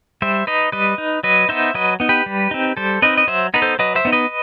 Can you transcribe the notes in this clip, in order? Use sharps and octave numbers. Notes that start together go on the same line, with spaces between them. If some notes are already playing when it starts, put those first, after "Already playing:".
G3 C5 E5
D#4 B4 D#5
G3 B4 D#5
D#4
F#3 B4 D#5
B3 D#4 C5 E5
F#3 B4 D#5
B3 D#4
G4 B4
G3
C4 D#4
G3 A4 C5
C4 D#4 B4 D#5
D#5
F#3 C5 E5
B3 D#4 B4
A4 C5
F#3 B4 D#5
C5 E5
B3 D#4
B4 D#5